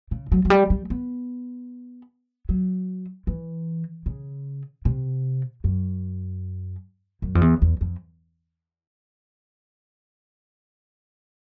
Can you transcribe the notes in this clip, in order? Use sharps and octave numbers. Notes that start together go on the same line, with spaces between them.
C#3
F#3
F#3
G3
G3
B3
F#3
E3
C#3
C3
F#2
F#2
F2
E2
E2
F2